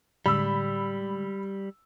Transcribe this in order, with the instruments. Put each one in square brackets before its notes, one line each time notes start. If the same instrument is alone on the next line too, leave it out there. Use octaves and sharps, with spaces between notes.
[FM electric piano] A2 D3 G#3 [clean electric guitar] G3 [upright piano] B5 E6